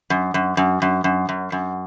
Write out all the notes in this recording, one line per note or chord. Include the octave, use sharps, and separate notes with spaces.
F#2
F#2
F#2
F#2
F#2
F#2
F#2